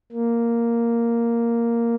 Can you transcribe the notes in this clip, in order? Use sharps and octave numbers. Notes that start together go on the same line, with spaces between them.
A#3